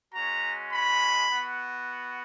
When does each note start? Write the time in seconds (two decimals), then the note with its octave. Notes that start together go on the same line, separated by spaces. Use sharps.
0.14 G#3 C#4 F#4 A#5
0.71 B5
1.28 B3 F#4